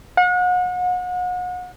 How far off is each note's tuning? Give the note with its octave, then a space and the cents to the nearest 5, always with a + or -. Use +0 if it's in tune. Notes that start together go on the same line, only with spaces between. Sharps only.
F#5 -35